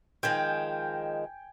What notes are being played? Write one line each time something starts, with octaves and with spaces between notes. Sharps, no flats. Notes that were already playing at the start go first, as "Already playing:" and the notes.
D#3 F3 G#3 G5 G#5